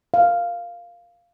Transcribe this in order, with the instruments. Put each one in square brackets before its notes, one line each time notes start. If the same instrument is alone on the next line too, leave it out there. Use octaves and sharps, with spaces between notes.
[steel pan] F5